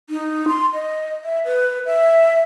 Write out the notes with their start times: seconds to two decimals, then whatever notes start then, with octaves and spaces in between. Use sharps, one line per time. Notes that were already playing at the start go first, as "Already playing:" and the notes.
0.10 D#4
0.48 C6
0.73 D#5
1.24 E5
1.45 B4
1.86 E5